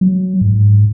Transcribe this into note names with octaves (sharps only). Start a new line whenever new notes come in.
F#3
G#2